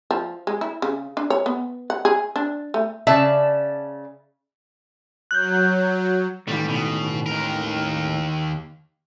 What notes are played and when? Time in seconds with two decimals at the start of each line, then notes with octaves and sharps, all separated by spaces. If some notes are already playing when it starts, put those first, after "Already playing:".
0.11 F3
0.47 G#3
0.61 E4
0.82 C#3
1.17 D4
1.30 C#5
1.46 B3
1.90 F#5
2.05 G#4
2.36 D4
2.74 A3
3.07 C#3 D5 E5 A5
5.31 F#3 F#6 G6
6.47 A2 D#3 E3 G3
6.68 B2
7.26 D#2 A#4